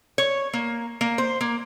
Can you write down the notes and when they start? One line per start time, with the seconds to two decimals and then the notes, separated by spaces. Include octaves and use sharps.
0.18 C#5
0.53 A#3
1.01 A#3
1.18 C5
1.41 A#3